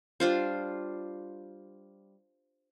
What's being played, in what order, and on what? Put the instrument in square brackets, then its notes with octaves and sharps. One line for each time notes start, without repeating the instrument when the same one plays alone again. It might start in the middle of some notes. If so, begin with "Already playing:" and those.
[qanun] G3 D4 F4 C5